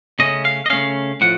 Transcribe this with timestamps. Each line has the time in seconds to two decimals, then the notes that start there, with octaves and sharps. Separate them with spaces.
0.19 C#3 A3 C#4 D#5
0.45 F5
0.66 D#5
0.70 C#3 A3 C#4 F5
1.21 A2 F3 F#5